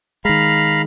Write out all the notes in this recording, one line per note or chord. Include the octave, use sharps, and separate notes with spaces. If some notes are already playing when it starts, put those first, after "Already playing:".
D#3 G#3 F5 A#5 B5